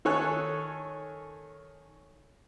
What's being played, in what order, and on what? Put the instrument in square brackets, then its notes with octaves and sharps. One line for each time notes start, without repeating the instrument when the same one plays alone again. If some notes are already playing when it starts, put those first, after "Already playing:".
[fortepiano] D#3 A4 C#5 G#5 F#6